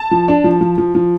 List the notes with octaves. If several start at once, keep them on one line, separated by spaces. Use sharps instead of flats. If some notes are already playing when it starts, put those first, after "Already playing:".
Already playing: A5
F3
D4
F3
F3
F3
F3